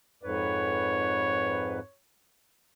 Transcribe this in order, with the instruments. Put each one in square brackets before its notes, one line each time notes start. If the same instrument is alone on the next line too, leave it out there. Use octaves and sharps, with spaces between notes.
[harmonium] F2 G#2 B4 [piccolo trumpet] C#5